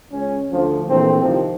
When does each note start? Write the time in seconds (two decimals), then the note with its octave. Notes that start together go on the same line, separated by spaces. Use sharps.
0.12 C#2 C#4
0.50 D2 F3
0.88 A#1 E3 A3 C4
1.21 C2 C3 D#3 F3